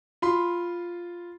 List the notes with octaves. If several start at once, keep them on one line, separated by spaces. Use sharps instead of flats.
F4 B5 C6